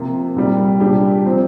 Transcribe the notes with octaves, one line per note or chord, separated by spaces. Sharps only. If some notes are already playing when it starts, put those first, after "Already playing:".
Already playing: C3 F3 A#3 F4
C2 A#2 G3
A#2 G3 D4 G4
C3 F3 C4